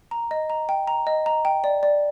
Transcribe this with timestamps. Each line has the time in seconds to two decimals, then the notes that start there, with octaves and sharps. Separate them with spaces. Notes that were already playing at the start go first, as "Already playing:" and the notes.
0.11 A#5
0.31 D#5
0.50 A#5
0.69 G5
0.87 A#5
1.07 D#5
1.26 A#5
1.45 G5
1.64 D5
1.83 D5